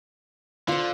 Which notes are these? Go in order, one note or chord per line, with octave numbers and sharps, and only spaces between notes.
D3 F4 C5